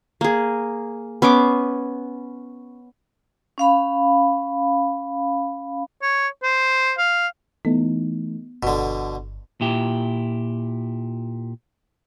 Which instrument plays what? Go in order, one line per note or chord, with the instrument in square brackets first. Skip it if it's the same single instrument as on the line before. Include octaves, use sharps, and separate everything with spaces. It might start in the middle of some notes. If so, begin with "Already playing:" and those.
[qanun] A#3 G#4
B3 C#4 C6 D6
[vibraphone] C#4 F5 B5
[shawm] C#5
C5
F5
[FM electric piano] E3 A3 D#4 [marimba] B3
[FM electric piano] G1 [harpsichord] B2 D3
[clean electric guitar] A#2 E4 G4